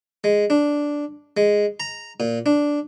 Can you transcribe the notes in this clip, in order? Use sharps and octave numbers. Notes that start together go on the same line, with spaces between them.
G#3
D4
G#3
A#5
A#2
D4